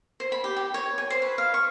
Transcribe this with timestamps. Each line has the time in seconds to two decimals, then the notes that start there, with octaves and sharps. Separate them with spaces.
0.20 C5
0.32 B5
0.44 G4
0.57 G4
0.74 C#5
0.98 G#5
1.10 C5
1.22 B4
1.38 F5
1.54 C#6